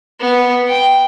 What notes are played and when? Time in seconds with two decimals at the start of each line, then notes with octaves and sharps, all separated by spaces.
0.20 B3
0.67 G5